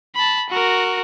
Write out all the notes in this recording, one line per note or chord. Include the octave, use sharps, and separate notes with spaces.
A5 B5
F#4 A#4